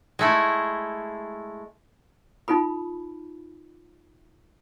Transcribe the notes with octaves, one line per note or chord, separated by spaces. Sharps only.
G#3 A3 E4
D#4 F4 A4 B5